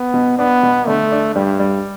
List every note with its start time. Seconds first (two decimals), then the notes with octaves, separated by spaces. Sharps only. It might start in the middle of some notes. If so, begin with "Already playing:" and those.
Already playing: B3
0.14 B2
0.38 B3 D4
0.63 B2
0.87 D3 A3
1.12 D4
1.36 G2 G3
1.60 G3